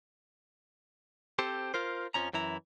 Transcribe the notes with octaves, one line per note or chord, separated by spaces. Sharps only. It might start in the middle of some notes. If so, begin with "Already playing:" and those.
C4 G4 A4 C5
F4 A#4 C5
F2 F3 C#4 A#5
F#2 E3 E4 A#5